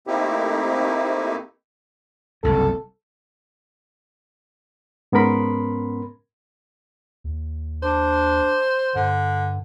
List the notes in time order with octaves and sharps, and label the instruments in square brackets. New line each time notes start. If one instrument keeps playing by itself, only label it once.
[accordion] A3 A#3 C4 D#4 E4 G4
[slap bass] F#1 C2 G2 [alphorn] A4
[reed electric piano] G#2 B3 C#4 A#4 B5 C6
[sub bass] D#2
[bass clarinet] D4 [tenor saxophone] C5
[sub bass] G2 [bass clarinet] D3